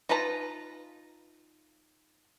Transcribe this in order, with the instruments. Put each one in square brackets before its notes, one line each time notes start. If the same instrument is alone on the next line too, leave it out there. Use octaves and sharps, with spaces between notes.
[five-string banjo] D#4 F4 B4 A5 A#5